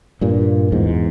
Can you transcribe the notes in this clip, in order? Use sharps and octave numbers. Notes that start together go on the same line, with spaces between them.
G2 A#2
E2 G#2